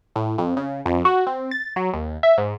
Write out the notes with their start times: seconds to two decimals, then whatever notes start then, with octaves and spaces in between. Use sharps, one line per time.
0.16 A2
0.38 F2
0.57 C#3
0.86 F2
1.05 F#4
1.27 C4
1.51 A6
1.76 F#3
1.94 D#2
2.23 E5
2.38 G#2